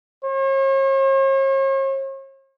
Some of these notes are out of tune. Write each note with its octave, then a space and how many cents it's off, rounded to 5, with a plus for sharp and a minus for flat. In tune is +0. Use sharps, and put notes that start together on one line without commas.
C#5 -45